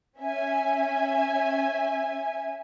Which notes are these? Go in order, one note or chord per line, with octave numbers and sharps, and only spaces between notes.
C#4 E5 G#5